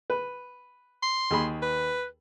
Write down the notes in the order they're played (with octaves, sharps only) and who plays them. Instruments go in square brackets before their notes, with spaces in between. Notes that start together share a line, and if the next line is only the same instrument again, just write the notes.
[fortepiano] B4
[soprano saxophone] C6
[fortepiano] D#2 G#4 B5
[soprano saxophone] B4